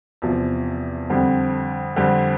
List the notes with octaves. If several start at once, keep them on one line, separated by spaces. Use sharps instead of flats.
E2 C3 F3
F2 D3 G3 C4
F2 D3 G3 C4